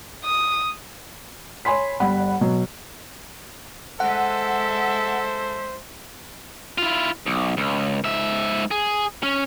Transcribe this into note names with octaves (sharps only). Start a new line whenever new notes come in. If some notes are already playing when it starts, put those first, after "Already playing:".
D#6
C#5 G#5 B5 C6 B6
G1 G3 F#5 B5
B2 F#3
G#3 A4 C5 E5 F#5
E4 F4
B1
C#2
G#2 E5
G#4
C#4